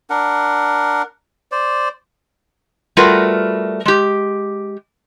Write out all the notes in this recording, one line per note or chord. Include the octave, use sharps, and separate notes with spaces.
D4 A#4 F#5
C5 D5
G3 A3 F4 F#4 A#4 B4
G#3 G4